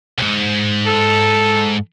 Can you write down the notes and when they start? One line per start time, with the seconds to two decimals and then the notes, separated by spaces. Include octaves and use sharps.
0.18 C2 G#2
0.87 A4